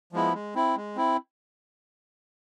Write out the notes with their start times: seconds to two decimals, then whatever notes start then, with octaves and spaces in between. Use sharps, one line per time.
0.13 F3 G#3 B3 E4
0.33 G#3
0.55 C4 E4
0.76 G#3
0.96 C4 E4